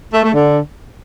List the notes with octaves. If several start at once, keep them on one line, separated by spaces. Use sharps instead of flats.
A3
A3
D3